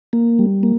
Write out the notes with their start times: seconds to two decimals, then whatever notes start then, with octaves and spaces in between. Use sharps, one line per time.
0.13 A#3
0.39 G3
0.63 A#3